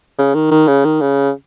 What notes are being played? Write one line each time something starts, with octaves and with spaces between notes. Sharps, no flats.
C#3
D#3
D#3
C#3
D#3
C#3